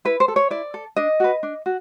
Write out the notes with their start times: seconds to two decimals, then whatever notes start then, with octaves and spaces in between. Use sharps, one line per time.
0.05 E4 B4
0.20 C5
0.28 A4
0.36 C#5
0.50 E4 D5
0.74 A4
0.96 D4 D#5
1.20 F#4 B4
1.43 D4
1.66 F#4